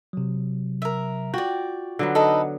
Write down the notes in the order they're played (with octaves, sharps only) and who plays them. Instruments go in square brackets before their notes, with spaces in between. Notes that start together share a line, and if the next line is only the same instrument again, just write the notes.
[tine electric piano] C3 F#3
[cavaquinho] A#4 E5
[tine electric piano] F4 [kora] F#4 [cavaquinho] D5 G5
[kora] D3 F#3 B3
[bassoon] D#4 [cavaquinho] A4 B4 D#5